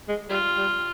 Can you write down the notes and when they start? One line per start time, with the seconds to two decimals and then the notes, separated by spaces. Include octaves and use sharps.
0.08 G#3
0.29 G3 F4
0.57 G3